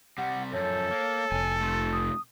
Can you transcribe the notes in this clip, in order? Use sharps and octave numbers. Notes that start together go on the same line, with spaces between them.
C3 G3 F#5
F#2 F3 A4 C#5
A#3
F1 G#5
A3 F4
D#6